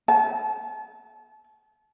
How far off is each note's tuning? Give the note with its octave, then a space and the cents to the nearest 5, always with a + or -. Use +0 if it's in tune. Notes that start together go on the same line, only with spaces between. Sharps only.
A5 -35